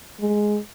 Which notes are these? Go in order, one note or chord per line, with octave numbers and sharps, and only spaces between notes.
G#3